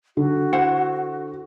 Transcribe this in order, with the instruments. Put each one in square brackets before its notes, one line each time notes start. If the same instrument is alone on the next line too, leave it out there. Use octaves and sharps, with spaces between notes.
[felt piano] D3 [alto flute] F#4
[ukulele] E4 C5 F#5